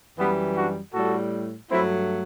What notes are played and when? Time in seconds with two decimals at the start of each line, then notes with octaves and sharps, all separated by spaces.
0.18 F#2 E3 G3 B3
0.56 D4 F#4
0.94 A2 G3 F#4 A4
1.70 G2 F#3 A3 C4 E4